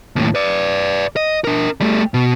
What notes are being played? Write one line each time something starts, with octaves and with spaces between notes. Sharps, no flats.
D#2 A2
B4 D5
D#5
D4 A#4
G3 A3
B2